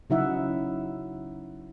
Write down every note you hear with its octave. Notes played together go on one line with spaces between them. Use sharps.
C#3 F#3 D#4 E4 E5 F#5